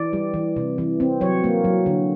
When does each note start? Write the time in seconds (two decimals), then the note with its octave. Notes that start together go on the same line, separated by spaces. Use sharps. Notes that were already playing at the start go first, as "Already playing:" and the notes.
Already playing: E3 D5
0.13 G3
0.34 E3
0.56 C3
0.78 E3
1.00 C4
1.21 F#3 C#5
1.44 A#3
1.64 F#3
1.86 D3